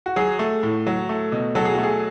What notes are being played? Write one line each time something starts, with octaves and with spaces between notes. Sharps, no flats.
F#4
F#3 G#4
A3
A2
F#3
A3
B2
F#3 A4
G#4
A3 F#4
G#4